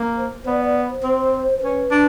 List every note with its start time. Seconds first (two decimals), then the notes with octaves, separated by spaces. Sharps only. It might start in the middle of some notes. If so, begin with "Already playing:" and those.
Already playing: A#3
0.17 C5
0.46 B3 D5
0.61 D5
0.89 C5
1.04 C4
1.62 C#4 B4
1.91 D4